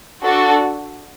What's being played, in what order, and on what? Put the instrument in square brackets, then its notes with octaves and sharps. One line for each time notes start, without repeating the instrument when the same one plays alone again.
[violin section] D4 F#4 A4